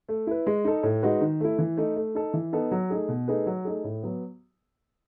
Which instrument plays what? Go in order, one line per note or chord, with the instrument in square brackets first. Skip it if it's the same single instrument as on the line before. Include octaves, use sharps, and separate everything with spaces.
[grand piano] A3
E4 B4
G#3
D#4 A4
A2
G#3 D#4 F#4 B4
D#3
A3 E4
E3
A3 D#4
A3
D#4 A4
E3
B3 D#4 A4
F#3
A3 D#4 G#4
B2
A3 D#4 G#4 B4
F#3
A3 D#4 G#4
A2
F#3 B3